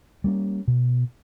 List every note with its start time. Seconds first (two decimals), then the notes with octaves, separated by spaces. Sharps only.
0.24 G3 A#3 C#4
0.68 B2